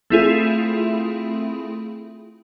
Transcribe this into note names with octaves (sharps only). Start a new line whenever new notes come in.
A3 C4 E4 F4 G#4